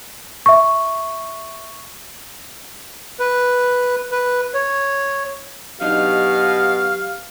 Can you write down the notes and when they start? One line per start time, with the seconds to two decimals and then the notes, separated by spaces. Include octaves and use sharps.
0.46 E5 C#6
3.19 B4
4.12 B4
4.54 C#5
5.81 B2 F#3 D4 D#4 G4 F5